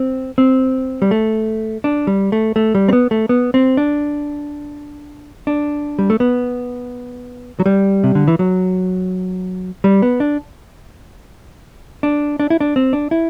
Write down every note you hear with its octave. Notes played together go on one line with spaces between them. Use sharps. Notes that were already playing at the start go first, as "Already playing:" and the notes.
Already playing: C4
C4
G3
A3
D4
G3
A3
A3
G3
C4
B3
A3
B3
C4
D4
D4
G3
A3
B3
F#3
G3
C3
D3
E3
F#3
G3
B3
D4
D4
D4
E4
D4
C4
D4
E4